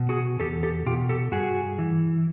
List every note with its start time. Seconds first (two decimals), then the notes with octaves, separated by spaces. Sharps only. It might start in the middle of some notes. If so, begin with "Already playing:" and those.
Already playing: B2
0.09 F#4 G#4
0.40 E2 G4 A4
0.63 G4 A4
0.86 B2 F4 G4
1.09 G4 A4
1.32 G2 F#4 G#4
1.79 E3